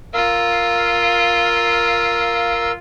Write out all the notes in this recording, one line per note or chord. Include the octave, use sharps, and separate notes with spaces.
F4 A#4 F5 E6